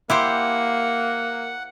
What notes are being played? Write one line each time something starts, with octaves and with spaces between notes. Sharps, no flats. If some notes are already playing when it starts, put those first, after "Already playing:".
A#3 E4 G4 C5 F#5